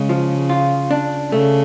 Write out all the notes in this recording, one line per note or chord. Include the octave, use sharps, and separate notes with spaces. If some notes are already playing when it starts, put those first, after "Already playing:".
Already playing: C#3 G#3
F3
F4
D4
C#3 A3